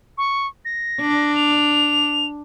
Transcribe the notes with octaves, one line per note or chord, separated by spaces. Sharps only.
C#6
A#6
D4
F7